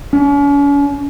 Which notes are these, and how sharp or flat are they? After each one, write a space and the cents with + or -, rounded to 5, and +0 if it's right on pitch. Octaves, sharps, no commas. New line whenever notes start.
C#4 +40